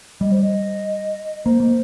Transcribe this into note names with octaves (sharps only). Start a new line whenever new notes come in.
G3 D#5
C5
D#5
A#3 C5
A#3